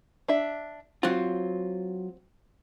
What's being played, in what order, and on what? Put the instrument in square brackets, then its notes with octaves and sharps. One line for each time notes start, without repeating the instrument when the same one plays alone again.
[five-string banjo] D4 E5
[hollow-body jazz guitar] F#3 F4 [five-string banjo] C4